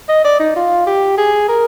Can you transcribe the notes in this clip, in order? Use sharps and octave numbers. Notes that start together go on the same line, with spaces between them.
D#5
D5
D#4
F4
G4
G#4
A#4